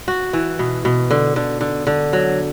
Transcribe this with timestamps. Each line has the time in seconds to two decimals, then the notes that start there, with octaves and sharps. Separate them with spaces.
0.08 F#4
0.33 E3
0.59 B2
0.85 B2
1.11 D3
1.36 D3
1.61 D3
1.87 D3
2.13 F#3